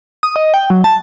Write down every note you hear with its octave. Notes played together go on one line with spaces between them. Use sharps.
D#6
D#5
G5
F#3
A5